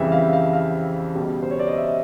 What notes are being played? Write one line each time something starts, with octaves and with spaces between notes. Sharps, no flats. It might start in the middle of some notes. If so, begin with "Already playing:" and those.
Already playing: F2 C#3 E3 G3 E5
F5
F5
F5
C#2 B2 G3
C5
C#5
D5
D#5
E5